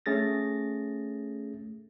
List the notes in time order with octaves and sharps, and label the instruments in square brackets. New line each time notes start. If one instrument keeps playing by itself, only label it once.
[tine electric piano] A3 C#4 G#4 A6 A#6